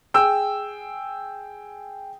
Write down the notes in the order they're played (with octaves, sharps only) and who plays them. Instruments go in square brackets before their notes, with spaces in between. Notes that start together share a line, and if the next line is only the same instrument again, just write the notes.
[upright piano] G#4 G5 E6